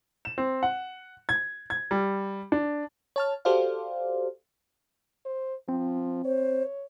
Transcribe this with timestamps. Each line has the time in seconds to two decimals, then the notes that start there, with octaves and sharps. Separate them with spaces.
0.25 E7
0.38 C4
0.63 F#5
1.29 G#6
1.70 G#6
1.91 G3
2.52 D4
3.16 C#5 A5 F6
3.45 F#4 G4 A4 C5 D5 F5
5.25 C5
5.69 F3 C4
6.25 C5 C#5